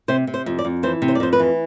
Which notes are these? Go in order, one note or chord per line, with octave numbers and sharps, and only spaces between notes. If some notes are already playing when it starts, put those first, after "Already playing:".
C3 C5
C3
C5
F2
D5
F2
E3 C5
C3
C5
D5
F2 C5
B4
E3